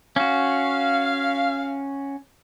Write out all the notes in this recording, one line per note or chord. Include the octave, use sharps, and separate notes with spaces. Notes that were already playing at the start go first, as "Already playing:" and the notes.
C#4 F#4 F5